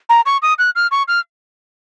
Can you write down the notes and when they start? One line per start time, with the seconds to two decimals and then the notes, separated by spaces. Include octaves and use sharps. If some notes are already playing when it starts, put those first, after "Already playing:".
0.09 A#5
0.26 C#6
0.42 D#6
0.59 F#6
0.75 F6
0.91 C#6
1.08 F6